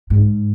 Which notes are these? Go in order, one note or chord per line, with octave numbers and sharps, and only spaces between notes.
G#2